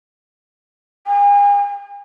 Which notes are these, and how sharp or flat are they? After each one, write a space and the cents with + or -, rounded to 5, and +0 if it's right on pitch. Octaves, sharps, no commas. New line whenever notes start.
G#5 -40